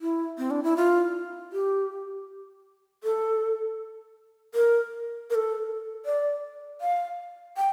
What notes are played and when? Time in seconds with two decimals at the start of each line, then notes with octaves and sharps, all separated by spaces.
0.01 E4
0.38 C4
0.51 D4
0.63 E4
0.77 F4
1.52 G4
3.04 A4
4.54 A#4
5.30 A#4
5.35 A4
6.06 D5
6.81 F5
7.57 G5